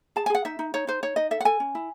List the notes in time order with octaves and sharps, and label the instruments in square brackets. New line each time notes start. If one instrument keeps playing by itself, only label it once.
[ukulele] G#4 A5
G#5
G#4 F#5
D#4 E5
D#4
D#4 C#5
D#4 C5
D#4 C#5
D#4 D#5
A4 E5
F#5
A4 G#5
C#4
E4